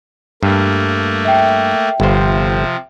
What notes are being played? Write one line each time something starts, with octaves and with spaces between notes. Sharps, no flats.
G2 A3 A#3
E5 G5
G1 C3 F3 C5